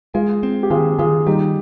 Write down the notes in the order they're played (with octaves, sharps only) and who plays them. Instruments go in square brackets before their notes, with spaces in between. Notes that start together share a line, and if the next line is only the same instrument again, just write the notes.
[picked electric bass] G#3 [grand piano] F4 G#4
[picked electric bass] C4
[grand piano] G4
[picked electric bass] D#3 [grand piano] F4 G#4
[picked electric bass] D#3 [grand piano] F4 G#4
[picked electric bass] G3 [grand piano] D#4 G4